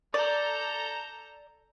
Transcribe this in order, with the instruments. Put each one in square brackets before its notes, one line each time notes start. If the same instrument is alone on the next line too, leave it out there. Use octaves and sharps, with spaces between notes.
[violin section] A4 A#5 G6 [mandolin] D5